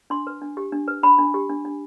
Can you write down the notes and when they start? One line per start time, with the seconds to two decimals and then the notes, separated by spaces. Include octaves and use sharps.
0.10 D4 C6
0.27 B4
0.42 D4
0.57 G4
0.72 D4
0.88 B4
1.03 D4 B5
1.18 D4
1.34 G4
1.49 D4
1.65 D4